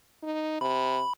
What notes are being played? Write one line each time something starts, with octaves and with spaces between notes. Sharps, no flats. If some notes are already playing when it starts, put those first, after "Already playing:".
D#4
C3 B5